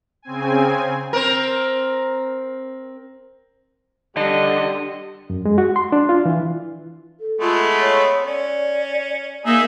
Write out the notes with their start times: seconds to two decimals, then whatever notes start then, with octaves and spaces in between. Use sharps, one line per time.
0.22 C#3 C4 G#5
1.13 C4 A#4
4.17 D3 G3 D#5
5.30 F#2
5.45 G#3
5.58 F#4
5.76 C6
5.92 D4
6.09 F4
6.25 E3
7.20 A4
7.41 G#3 A3 B3 F4
7.81 C#5
8.26 C#4 D5
9.46 A#3 D#4 G#4 E5